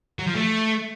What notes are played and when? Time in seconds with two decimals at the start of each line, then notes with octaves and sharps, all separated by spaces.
0.19 F#3
0.27 F3
0.34 A3